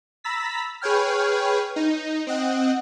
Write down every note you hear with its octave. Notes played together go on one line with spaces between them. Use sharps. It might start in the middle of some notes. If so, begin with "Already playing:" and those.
A#5 B5 E6 A6 B6
G#4 B4 C#5 G5 F6
D#4
C4 D#5 F#5